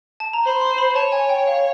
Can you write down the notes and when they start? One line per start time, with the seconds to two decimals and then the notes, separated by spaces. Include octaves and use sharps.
0.20 A5
0.33 A#5
0.44 C5 B5
0.61 C6
0.78 B5
0.95 C#5 A5
1.12 G#5
1.29 G5
1.47 F5